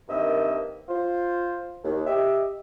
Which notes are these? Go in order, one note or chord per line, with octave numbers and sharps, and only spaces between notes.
G2 D#3 A#3 C4 D#5 E5
F4 C5
D#2
G4 D#5 E5